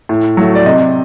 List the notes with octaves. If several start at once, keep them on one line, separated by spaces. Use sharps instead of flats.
A2
F#3 A3
D5
C3 D#5